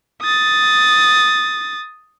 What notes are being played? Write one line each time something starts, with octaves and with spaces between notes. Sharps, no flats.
D#6 A6